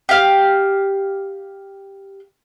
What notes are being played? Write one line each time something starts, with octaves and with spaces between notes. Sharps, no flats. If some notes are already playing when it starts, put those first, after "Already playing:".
G4 F5